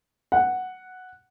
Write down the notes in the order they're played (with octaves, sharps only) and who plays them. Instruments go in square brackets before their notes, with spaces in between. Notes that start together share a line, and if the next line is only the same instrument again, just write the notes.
[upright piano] F#5